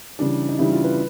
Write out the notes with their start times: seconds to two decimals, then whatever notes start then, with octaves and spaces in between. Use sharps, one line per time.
0.19 C#3 E3 G3 D4
0.49 D#4
0.59 C#3 E3 G3 E4
0.72 F4
0.84 B4